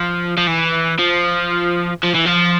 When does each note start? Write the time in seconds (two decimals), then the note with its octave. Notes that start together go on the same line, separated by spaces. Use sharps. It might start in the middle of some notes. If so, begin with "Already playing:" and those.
Already playing: F3
0.37 F3
0.47 E3
0.99 F3
2.04 F3
2.15 E3
2.26 F3